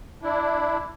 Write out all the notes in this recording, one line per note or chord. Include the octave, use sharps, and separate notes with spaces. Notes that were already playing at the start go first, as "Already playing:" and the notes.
D4 E4